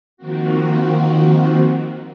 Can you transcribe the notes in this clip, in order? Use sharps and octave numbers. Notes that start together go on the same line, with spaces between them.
D#3 F3 A#3 C4 F#4